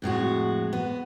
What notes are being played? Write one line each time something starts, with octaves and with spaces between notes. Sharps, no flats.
F2 A2 G#3 F#4
B3